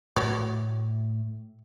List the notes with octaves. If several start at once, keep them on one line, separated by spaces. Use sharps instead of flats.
A2 A3 F#4 C#5 D5